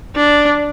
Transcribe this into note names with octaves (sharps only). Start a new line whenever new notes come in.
D4